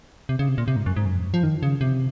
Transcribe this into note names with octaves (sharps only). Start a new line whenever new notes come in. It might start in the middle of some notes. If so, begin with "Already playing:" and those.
C3
C#3
C3
A#2
C3
G#2
F#2
G#2
F#2
F2
F#2
F3
D#3
C#3
C3